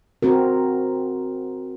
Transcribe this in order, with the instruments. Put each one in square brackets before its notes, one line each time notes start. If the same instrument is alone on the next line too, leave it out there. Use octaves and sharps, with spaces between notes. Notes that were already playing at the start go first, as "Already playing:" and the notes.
[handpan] C4 F#4 A#4